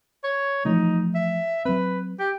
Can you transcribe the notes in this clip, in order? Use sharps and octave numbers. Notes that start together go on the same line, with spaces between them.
C#5
E3 F3 A3 D#4
E5
F#3 C4 B4
G4